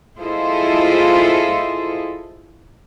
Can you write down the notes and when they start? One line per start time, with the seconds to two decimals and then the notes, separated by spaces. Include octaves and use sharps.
0.19 E4 F4 G#4 A4 C5 D#5